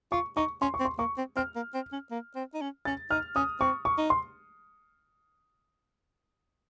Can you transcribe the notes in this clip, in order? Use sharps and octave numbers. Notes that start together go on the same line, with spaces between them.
F4 C#6
D#4 C#6
C#4 C6
C#6
C4
C6
A#3 C#6
C4
C4 F6
A#3
C4
C#4
A#3
C4
D#4
C#4
C#4 A6
D#4 F6
C#4 D#6
C4 C#6
C#6
D#4
C6